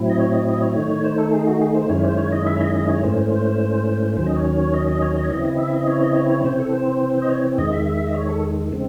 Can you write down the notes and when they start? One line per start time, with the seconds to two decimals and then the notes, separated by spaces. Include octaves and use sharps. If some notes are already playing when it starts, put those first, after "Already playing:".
Already playing: A2 F#3 C4 E4
0.10 D#5
0.20 C#5
0.33 D#5
0.47 D#5
0.62 C#5
0.76 D#3 A3 D#4
1.04 C5
1.18 A4
1.33 G#4
1.47 F#4
1.61 G#4
1.75 C5
1.89 F#2 D#3 G#3 C#4 E4 C#5
2.04 C5
2.18 C#5
2.32 D#5
2.47 E5
2.56 C#5
2.60 D#5
2.75 D#5
2.89 C#5
3.03 G#2 E3 A3 C#4 C5
4.17 D#2 D#3 F#3 C#4 C5
4.27 D#5
4.36 C#5
4.74 D#5
4.88 D#5
5.02 C#5
5.17 D#5
5.24 C#5
5.30 C#3 E3 C4 E4 D#5
5.45 D#5
5.59 E5
5.74 D#5
5.87 C#5
6.02 D#5
6.16 C#5
6.30 C#5
6.44 C3 E3 C4 C5
6.59 A4
6.72 C5
7.22 D#5
7.29 C#5
7.58 E2 D#3 G#3 D#5
7.72 E5
7.86 E5
8.07 D#5
8.14 C#5
8.29 A4
8.72 C#3 G#3 C4